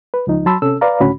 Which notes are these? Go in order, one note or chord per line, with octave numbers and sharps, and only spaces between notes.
B4
C#2 F3 D#4
F#3 A5 B5 C6 E6
C3 C#4 A4 E6
B4 D5 F5 A#5
C#2 A2 D3 C#4 F#4 B5